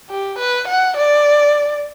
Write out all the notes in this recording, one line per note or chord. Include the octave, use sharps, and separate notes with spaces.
G4
B4
F#5
D5